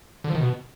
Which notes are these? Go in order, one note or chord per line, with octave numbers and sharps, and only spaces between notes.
D3
F3
D#3
B2